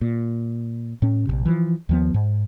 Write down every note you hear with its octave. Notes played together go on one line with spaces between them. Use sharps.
A#2
A2 C#4
A#1 D#2 C3
E3 F3
D#2 F3 B3
G#2